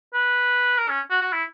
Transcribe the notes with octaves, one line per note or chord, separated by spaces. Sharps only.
B4
A#4
C#4
F#4
F#4
E4